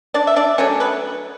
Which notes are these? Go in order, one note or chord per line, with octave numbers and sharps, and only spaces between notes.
D4 D5
E5
D4 D5
F#3 A3 C#4 D4 C#5
B3 B4